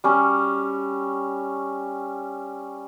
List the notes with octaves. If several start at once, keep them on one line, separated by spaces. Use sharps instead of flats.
G3 C#4